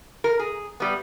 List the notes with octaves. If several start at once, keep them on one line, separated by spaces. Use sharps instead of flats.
A#4
G#4
G3 B3